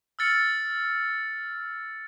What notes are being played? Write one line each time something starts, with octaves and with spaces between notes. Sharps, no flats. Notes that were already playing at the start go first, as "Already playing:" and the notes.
E6 F6 A6 C#7